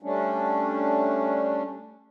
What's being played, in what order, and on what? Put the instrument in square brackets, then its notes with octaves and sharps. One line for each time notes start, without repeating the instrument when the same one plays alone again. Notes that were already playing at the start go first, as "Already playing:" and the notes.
[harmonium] G3 A3 C#4 D4